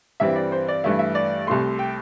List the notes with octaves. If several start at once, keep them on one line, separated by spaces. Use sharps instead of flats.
G2 E3 G3 C4 E5
D5
C5
D5
G2 E3 A3 E4 E5
E5
D5
C2 C3 A3 C6
G5